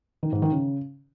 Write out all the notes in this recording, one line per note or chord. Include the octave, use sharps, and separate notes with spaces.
D#3
G#2
D#3
C#3